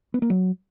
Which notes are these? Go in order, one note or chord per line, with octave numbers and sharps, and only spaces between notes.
B3
A#3
F#3